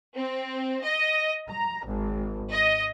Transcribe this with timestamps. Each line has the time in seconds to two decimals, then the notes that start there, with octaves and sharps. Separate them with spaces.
0.15 C4
0.84 D#5
1.48 A#5
1.85 G#1
2.51 D#5